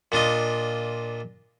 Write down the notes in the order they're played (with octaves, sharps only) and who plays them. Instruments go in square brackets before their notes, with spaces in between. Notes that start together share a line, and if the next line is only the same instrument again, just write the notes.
[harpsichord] A#2 D4 F4 D#5